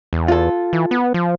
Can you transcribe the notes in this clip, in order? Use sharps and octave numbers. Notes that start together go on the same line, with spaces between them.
E2
F4 A4
E3
B3
F3